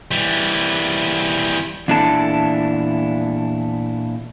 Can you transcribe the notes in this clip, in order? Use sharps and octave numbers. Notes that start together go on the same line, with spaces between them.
E3 G3
E2 A#2 D4 E4 A4 A5